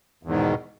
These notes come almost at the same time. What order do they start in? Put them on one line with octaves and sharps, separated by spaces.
E2 G#2 D#3 B2